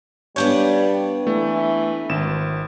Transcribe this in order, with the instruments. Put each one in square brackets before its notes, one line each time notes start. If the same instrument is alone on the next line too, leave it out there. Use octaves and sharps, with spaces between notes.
[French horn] G3 [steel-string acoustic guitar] B3 D4 F5 [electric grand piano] C#5 G6
[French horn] E3 [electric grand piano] A3
[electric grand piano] G#1 E7